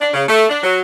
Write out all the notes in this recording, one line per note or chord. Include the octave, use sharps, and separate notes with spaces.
D4
C#3
A3
D4
F#3